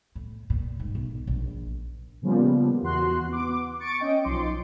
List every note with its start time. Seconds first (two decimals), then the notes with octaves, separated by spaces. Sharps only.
0.15 A2
0.50 A#2
0.80 G#2
0.95 B1
1.27 A#1
2.22 A#2 C#3 F3 G3 A#3 B3
2.82 E2 E3 F#4 C6 F#6
3.29 B3 D6
3.80 C#6 A6 C#7 D7
4.00 C#4 D#5 G5
4.24 B1 F3 D#4 C6 D6